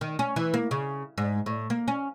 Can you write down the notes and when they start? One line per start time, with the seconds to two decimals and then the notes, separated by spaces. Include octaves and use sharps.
0.01 D#3
0.19 C#4
0.36 E3
0.54 A#3
0.71 C#3
1.18 G#2
1.46 A2
1.70 A#3
1.88 C#4